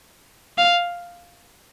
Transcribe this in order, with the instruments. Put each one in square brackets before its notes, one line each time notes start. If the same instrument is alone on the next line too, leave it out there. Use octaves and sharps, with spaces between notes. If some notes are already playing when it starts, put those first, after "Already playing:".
[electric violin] F5